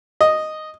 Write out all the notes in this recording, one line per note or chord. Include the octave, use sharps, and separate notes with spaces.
D#5